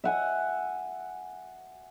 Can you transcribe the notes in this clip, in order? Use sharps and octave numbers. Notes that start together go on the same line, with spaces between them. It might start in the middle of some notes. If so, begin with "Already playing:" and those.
E5 F#5 G#5